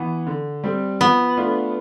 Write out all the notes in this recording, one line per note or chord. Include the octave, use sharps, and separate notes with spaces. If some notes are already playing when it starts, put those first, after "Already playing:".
Already playing: E3 B3
D3
G3 C4
F3 B3
A3 D4 F4